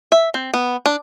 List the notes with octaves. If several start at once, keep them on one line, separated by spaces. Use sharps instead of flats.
E5
C4
B3
D4